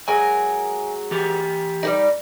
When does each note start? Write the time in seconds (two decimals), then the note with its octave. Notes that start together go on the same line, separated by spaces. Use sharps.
0.08 F#3 G#3 A#4 G#5
1.12 E3 G4
1.83 G3 G#3 D#4